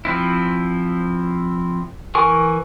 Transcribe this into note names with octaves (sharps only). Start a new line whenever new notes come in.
F3 C4 E4
E3 A#4 G#5 C#6